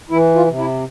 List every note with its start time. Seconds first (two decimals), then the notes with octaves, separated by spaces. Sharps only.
0.10 E3 E4
0.35 F4
0.47 C3
0.59 E4